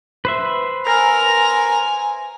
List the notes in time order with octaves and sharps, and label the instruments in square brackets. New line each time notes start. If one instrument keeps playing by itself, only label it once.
[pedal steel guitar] B4 C5 E5
[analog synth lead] A#4 [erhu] G#5 [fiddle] A#5